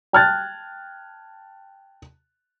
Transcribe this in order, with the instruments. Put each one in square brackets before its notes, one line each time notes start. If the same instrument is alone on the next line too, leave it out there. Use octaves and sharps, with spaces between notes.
[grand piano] G5 A5 F6 F#6 G#6 A6